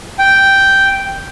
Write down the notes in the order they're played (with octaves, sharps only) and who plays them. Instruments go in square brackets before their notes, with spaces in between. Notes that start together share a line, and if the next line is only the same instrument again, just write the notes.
[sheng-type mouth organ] G5